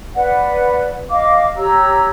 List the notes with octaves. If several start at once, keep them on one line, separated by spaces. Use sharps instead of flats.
B4 D5 F#5
D#5 F5 D6
G4 C#5 A#5 E6